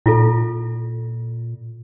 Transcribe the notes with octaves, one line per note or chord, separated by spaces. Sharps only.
A#2 E4 F4 A4